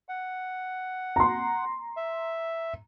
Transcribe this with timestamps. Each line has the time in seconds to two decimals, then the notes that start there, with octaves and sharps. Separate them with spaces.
0.09 F#5
1.16 A#5 C6
1.97 E5